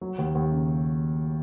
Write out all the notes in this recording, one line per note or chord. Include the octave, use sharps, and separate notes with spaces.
F#3
D#2
D#2
C#3